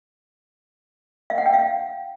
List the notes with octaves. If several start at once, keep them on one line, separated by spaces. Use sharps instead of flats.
F5
F#5
G5
F5